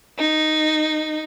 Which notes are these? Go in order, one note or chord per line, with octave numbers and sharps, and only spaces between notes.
D#4